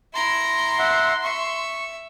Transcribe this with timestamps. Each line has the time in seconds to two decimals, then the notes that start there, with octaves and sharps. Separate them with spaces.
0.14 E4 A#5 C6
0.79 E5 F#5
1.24 E5 C#6